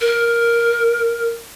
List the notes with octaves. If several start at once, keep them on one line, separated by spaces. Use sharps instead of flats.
A#4